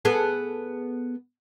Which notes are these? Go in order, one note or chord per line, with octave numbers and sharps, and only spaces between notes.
B3 G#4 A4